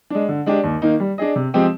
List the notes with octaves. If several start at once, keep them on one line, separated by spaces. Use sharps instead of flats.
G#3 D4
D3
G#3 D4 G4 D5
D#2
D#3 A#3 D#4
G3
D4 G#4 D#5
C3
F3 G#3 C4 G4